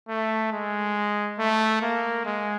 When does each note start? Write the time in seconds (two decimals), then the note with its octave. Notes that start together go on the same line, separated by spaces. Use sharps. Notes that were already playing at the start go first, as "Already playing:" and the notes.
0.08 A3
0.52 G#3
1.39 A3
1.82 A#3
2.25 G#3